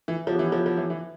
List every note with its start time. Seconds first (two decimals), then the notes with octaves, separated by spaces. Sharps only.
0.08 E3
0.26 F3 F#3 B3 E4 G4
0.39 E3
0.52 F3
0.66 F3
0.77 E3
0.90 E3